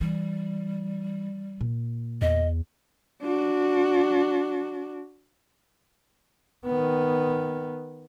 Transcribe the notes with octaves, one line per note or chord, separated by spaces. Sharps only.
E3 G3
A#2
E2 D#5
D4 F#4
D#3 B3